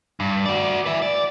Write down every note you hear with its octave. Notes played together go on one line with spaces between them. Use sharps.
G2
F#4 D5
B4 E5
D5